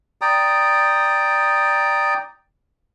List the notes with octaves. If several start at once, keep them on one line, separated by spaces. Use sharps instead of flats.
D5 G5 A#5 D#6